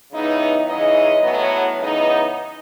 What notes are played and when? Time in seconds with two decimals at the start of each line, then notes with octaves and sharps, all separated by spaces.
0.12 C#3 E3 B3 D#4
0.67 C#3 E3 G#3 D#4 D#5
1.22 A2 F#3 B3
1.79 C#3 E3 B3 D#4